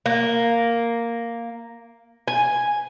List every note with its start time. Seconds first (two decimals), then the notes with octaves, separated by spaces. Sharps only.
0.06 A#3
2.28 G#5